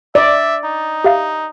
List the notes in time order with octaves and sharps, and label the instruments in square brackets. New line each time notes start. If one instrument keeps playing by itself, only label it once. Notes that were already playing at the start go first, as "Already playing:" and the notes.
[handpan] D5 [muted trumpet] E5
[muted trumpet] D#4
[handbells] G4 E5 F5